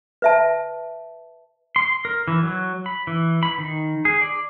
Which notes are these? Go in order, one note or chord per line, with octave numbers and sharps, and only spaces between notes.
B4 E5 A5
C6
A#4
E3
F#3
B5
E3
B5
D#3
G#4
D5